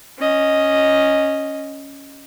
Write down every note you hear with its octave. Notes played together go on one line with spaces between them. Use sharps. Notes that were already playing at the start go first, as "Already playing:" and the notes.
C#4 D#5